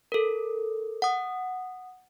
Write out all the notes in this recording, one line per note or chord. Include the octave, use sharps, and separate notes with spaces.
A4 A#4
F#5 D#6